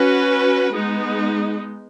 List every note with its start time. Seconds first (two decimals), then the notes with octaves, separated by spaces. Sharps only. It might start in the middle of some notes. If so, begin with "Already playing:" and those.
Already playing: C#4 F#4 B4
0.73 G#3 B3 D#4